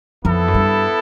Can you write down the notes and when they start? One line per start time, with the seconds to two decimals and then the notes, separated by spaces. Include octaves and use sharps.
0.25 F2 B3 E4 A4
0.48 F#2
0.54 G2